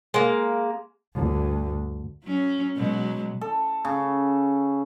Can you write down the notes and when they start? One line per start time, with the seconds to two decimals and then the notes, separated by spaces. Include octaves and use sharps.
0.14 G#3 A#3
1.14 D2 G2
2.24 F#3 C#4
2.77 B2 F#3 G#3
3.41 A4
3.85 C#3